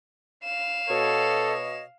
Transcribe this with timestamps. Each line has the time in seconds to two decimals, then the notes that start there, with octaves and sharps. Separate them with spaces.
0.44 F5 E7
0.89 B2 A4 C#5 D#5